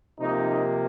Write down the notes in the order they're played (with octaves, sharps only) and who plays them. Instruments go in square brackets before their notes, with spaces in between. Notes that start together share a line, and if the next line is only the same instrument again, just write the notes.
[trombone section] C3 F3 A#3 D#4